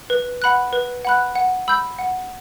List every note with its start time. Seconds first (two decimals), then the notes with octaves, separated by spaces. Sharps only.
0.10 B4
0.42 F#5 B5 F#6
0.73 B4
1.05 F#5 B5 F#6
1.36 F#5
1.68 B5 E6 G6
1.99 F#5